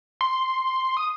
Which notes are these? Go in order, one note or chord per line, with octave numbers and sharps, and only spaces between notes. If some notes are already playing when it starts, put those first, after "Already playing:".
C6
D#6